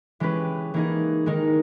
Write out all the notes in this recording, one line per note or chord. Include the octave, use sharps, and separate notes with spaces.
E3 G#3 C#4 G4 B4
E3 A#3 D#4 G#4
D#3 G#3 D#4 A#4